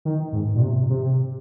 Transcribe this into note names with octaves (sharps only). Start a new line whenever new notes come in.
D#3
G#2
A#2
C3
C3